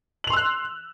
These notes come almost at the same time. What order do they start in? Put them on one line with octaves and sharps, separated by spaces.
F#7 F7 C6 E6 F#6